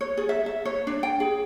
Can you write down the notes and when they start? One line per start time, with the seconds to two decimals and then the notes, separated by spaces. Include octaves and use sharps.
0.01 C#5
0.17 G#4
0.29 E5
0.46 E5
0.65 C#5
0.87 D4
1.03 G5
1.20 G#4